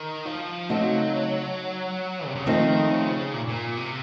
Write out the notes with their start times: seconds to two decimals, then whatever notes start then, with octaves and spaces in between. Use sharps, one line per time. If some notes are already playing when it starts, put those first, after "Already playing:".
Already playing: D#3
0.25 F3
0.69 C#3 F#3 A3 C4 D#4 F#4
2.26 C3
2.35 C#3
2.45 D#3 F3 A3 C4 D#4
2.90 C#3
3.33 A#2
3.48 A#2
3.77 C3